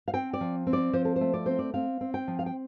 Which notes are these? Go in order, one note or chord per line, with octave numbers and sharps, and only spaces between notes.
F5
C4 G5
D5
F3
C4
D5
F3 C5
A4
A3 C5
D5
C4 C5
D5
C4 F5
C4
G5
F3
F5
G5